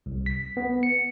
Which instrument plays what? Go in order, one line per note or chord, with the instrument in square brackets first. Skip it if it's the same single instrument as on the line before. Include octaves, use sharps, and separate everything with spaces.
[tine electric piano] C2
B6
B3
C#7